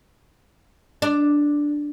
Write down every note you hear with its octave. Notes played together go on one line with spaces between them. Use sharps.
D4